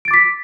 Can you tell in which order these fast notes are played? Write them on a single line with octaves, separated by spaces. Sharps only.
D7 A6 D6 B6